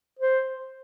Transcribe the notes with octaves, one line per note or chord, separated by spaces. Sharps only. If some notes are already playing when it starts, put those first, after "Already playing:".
C5